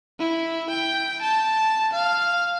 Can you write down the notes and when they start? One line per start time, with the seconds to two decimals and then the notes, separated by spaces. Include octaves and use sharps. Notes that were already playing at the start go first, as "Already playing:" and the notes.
0.20 E4
0.70 G5
1.22 A5
1.93 F5